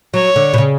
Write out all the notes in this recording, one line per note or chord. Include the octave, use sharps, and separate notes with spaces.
F#3 C#5
D3
B2
C#3